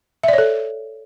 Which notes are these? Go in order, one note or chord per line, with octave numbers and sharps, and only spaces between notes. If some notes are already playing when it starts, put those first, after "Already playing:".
A4 C#5 D5 E5